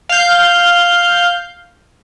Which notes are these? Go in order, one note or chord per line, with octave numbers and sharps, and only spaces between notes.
F5 G6